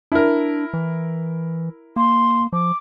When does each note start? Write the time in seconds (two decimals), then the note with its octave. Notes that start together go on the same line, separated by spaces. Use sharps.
0.12 D4 E4 A#4
0.74 E3
1.96 A#3 C6
2.53 F3 D6